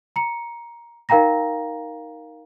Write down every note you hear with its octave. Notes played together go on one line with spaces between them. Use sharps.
A#5 C#7
D#4 A#4 F5 G5 A#5 A#6